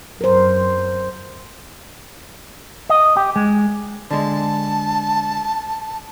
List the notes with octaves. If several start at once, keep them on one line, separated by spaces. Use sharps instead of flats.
F#2 A#4 C5
D#5
G4
G#3
D3 G#3 A5